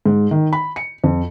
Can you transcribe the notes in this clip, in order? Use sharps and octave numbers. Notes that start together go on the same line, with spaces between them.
G#2
D#3
B5
C#7
F2